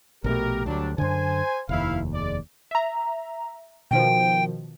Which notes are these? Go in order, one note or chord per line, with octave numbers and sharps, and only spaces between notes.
A#1 B2 A3 G4 A#4
D2 F#3 G3 D4
F#2 D3 C5 G#5
F1 D#2 E4 F5
G#3 D5
E5 A#5
B2 D#3 F3 G5